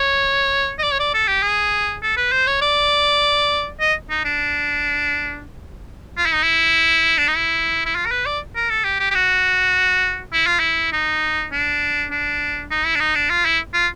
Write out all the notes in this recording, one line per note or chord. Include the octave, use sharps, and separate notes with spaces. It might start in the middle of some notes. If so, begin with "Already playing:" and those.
Already playing: C#5
D#5
D5
C#5
D5
A4
G4
G#4
A4
B4
C5
C#5
D5
D#5
D#4
D4
F4
E4
D#4
E4
D4
D#4
E4
E4
F4
A#4
B4
D5
A#4
A4
G4
G4
G4
F#4
E4
F4
E4
D#4
D4
D4
D#4
E4
D4
D#4
D4
F4
E4
F4